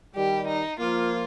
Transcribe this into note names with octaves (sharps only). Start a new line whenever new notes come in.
D#3 G3 G4
D#4
F3 A#3 F4